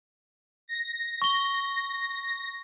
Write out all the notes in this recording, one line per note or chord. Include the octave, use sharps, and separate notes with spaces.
A#6
C#6 G7